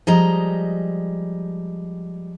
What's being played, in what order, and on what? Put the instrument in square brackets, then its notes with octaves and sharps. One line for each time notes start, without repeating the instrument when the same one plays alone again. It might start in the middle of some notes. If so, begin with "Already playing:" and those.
[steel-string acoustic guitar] F3 G3 G#3 D#5 A#5